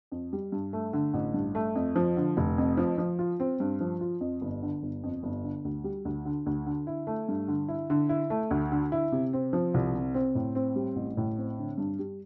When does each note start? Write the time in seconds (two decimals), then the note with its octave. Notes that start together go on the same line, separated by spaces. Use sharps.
0.12 F2
0.33 G3
0.52 G2
0.73 A3
0.93 D3
1.14 A1
1.34 G2
1.55 A3
1.75 F2
1.96 F3
2.17 D3
2.37 F1
2.58 F2
2.77 F3
2.98 F3
3.19 F4
3.40 C4
3.60 G2
3.80 F3
4.01 F4
4.21 F2
4.41 G1
4.63 D3
4.83 G1
5.03 F2
5.23 G1
5.44 D3
5.65 D2
5.84 G3
6.05 D2
6.25 D3
6.46 D2
6.67 D3
6.87 E4
7.07 A3
7.29 G2
7.48 D3
7.68 E4
7.90 D3
8.09 E4
8.30 A3
8.51 D2
8.72 D3
8.92 E4
9.12 C3
9.33 C4
9.53 F3
9.74 C2
9.94 C3
10.14 C4
10.35 A2
10.55 C4
10.76 G3
10.96 A1
11.17 A2
11.38 C4
11.58 D3
11.78 G2
11.99 G3